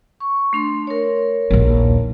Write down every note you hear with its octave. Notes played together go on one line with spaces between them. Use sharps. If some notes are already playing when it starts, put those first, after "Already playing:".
C#6
A3 D4 C6
A#4 C#5
A#1 D#2